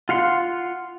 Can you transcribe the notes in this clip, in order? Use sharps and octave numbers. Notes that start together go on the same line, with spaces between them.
F4 F5 F#5 C6